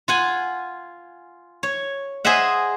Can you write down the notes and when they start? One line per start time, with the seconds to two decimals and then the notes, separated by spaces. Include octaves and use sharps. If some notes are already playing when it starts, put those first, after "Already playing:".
0.08 F4 F#5 G#5
1.63 C#5
2.25 G#4 C5 D#5 E5 F#5